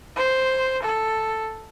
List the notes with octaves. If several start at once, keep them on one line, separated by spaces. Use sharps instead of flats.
C5
A4